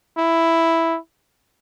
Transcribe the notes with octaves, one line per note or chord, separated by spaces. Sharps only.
E4